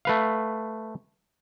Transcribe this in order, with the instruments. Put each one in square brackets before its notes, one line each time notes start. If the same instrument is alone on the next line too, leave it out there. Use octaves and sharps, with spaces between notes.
[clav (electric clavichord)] A3 B4 F5